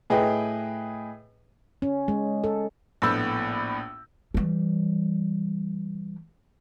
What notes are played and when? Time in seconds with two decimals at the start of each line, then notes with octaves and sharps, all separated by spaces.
0.10 A2 G#4 B4 D#5 G5
1.82 C#4
2.08 G#3
2.44 A4
3.02 A#1 A2 B3 B5 E6 G6
4.34 E3 G3